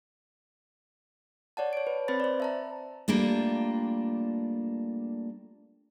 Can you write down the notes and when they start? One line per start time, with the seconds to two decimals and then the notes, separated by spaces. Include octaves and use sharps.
1.57 C#5 D5 F#5 A5
1.73 C#5 D7
1.87 B4
2.08 C4 B4 C5 B5 A6
2.20 C5 D5
2.40 E5 A5 A#5
3.08 G3 A3 A#3 D4 F4